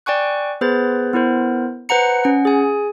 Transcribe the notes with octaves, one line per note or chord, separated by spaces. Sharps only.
D5 G5 G#5 C#6 F#6
B3 G#4 B4 C5 B5 A6
B3 E4 A#4 C5
B4 C5 F#5 A#5 C#7
C#4 F#5
G#4 G#5